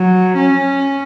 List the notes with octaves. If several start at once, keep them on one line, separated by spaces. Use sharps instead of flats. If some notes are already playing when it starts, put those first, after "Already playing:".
Already playing: F#3
C#4